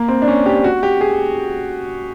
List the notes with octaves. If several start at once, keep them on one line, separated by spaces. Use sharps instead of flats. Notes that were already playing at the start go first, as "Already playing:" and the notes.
Already playing: A#3
C4
D4
C#4
G4
F#4
G4
G#4